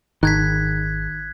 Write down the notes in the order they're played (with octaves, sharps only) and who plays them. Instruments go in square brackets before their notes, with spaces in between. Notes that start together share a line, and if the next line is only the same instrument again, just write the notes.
[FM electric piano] G#1 [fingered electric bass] D#3 [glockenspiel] F#6 G#6 B6